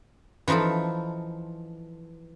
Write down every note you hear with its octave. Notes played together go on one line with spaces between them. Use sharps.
E3 F3 D#4 F4 A4